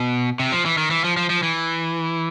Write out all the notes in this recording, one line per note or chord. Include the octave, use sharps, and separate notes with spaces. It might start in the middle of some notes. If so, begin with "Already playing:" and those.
Already playing: B2
C3
F3
E3
D#3
E3
F3
F3
F3
E3